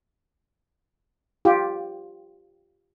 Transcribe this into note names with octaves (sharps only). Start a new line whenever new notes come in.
F4 G4